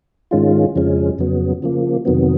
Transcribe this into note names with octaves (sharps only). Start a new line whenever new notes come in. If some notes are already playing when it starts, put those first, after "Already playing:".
G#2 D#3 G#3 C#4 F4
F2 C#3 F3 G#3 C#4
F2 C#3 F#3 B3
C#3 F3 A#3
F2 C3 D#3 F#3 B3